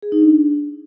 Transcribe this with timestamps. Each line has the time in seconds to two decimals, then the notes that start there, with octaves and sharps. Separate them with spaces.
0.02 G#4
0.12 D#4
0.22 D4